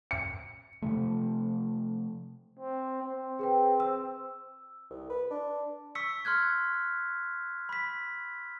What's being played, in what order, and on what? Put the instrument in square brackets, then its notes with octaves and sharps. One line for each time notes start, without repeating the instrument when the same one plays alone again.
[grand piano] C#7
[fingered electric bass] C3 F3 A3
[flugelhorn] C4
C4
[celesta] G#4 B4 G5
E6
[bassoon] C2
B4
D4
[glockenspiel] C#6 E6 B6 C#7
C6 F6 F#6 G#6
B5 B6